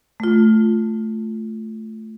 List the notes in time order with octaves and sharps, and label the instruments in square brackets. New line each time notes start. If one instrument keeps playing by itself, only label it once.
[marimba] A3 F4